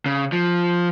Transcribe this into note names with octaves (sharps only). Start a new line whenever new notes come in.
C#3
F3